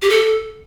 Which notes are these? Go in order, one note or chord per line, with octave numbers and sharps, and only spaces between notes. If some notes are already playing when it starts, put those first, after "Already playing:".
G4
A4